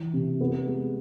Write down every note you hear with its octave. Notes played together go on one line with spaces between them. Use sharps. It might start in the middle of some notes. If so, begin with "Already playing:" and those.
Already playing: E3
C3
B3
G#3